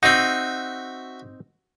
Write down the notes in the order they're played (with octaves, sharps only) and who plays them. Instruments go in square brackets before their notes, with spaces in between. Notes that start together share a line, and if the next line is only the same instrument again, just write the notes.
[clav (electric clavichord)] C4 D#4 [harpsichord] F#4 E5